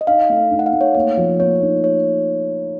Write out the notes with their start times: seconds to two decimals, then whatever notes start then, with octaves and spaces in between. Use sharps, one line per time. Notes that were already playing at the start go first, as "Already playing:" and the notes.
0.01 D#5
0.07 D#4 F5
0.29 A3
0.51 D#4
0.59 F#5
0.66 F5
0.73 A3
0.81 C#5
0.95 A#3 C#5
1.17 F3
1.39 A#3 C#5
1.62 D#4
1.84 C#5